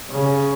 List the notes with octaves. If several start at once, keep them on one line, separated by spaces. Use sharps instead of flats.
C#3